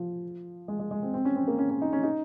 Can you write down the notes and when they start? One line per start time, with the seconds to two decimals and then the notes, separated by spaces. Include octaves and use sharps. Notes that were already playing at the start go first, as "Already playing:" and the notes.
Already playing: F3
0.68 G#3
0.80 G#3
0.91 G#3
1.03 C4
1.14 C4
1.25 C#4
1.36 C4
1.48 A#3
1.59 C#4
1.70 C#4
1.82 D#4
1.93 C#4
2.03 D#4